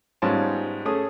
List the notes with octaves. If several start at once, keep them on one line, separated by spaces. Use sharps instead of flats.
G#2 G3 B3 C#4 F4 A5
A3 C#4 G#4 D#6